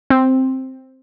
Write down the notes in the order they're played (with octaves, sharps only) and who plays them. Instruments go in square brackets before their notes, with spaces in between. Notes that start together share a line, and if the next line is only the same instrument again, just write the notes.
[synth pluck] C4